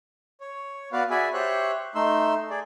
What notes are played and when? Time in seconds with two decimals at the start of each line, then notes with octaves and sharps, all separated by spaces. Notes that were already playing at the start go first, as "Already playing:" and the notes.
0.41 C#5
0.93 B3 F#4 B4 D5 F5
1.10 F#4 G#4 D5 E5 G#5 B5
1.33 G4 C5 C#5 E5 F#6
1.95 A3 D#4 C6 E6
2.50 G#4 D5